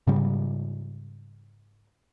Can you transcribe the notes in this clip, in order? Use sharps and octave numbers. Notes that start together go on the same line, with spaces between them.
G#2 C#3 G3